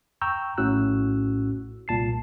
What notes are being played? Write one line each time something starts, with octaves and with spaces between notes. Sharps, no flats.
G5 A#5 C#6 E6 G6
A#1 A2 C#4 F#4 E6 F#6
C2 A#2 A5 C7